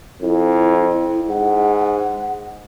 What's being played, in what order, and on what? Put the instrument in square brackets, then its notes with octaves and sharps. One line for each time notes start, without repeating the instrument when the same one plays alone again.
[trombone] F2 [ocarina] E4
[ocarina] E4
[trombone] G#2 [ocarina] F#5